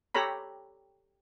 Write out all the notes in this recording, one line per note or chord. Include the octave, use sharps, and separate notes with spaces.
G4 A4 C#5 A#5 B5